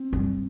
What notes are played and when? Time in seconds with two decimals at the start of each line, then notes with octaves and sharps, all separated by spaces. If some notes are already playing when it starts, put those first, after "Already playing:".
Already playing: C4
0.13 G2